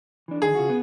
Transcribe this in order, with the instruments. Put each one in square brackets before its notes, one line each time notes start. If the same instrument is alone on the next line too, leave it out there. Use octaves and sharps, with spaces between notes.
[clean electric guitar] E3 D4
[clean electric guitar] D3 D#3 [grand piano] G#4
[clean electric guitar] C#3 F4 F#4
B3